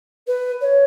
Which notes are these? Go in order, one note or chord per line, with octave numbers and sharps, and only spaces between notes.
B4
C#5